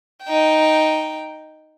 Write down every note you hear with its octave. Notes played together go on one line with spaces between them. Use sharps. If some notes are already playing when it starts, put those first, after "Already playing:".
D#4 G5